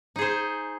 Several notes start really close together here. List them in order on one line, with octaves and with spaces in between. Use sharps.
D#4 G#4 C5